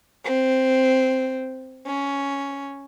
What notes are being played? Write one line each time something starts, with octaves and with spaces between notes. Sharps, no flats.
C4
C#4